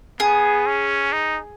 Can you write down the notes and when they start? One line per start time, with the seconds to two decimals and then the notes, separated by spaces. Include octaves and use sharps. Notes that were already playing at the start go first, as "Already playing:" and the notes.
0.20 B3 G#4
0.66 C#4
1.12 D#4